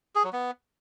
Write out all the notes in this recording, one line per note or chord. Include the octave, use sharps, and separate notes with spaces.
G#4
F#3
B3